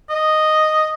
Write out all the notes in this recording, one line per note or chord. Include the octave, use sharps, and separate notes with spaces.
D#5